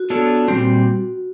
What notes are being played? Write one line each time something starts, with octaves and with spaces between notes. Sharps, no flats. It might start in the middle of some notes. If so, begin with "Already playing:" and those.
Already playing: F#4
B3 D4 F4 A4 C#5
A#2 G3 C4